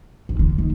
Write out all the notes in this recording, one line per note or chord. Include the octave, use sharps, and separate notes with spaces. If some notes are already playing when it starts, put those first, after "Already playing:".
D3
D3
D#3